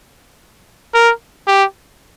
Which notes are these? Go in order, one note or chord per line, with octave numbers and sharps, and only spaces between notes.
A#4
G4